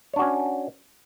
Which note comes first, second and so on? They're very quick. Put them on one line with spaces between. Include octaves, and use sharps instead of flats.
C#5 D4 F#4 C#4